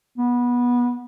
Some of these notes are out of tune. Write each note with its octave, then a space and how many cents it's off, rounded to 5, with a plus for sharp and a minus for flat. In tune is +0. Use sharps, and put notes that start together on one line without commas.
B3 -20